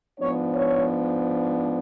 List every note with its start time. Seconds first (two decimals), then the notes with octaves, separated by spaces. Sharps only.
0.19 G#2 F3 B3 D4 C#5
0.54 C#5